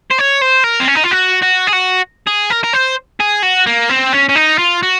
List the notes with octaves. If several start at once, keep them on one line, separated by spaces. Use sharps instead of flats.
C5
C#5
C5
A#4
C4
C#4
D#4
F4
F#4
F#4
G#4
F#4
G#4
A#4
A#4
C5
G#4
F#4
A#3
C4
C#4
C#4
D#4
F4
F#4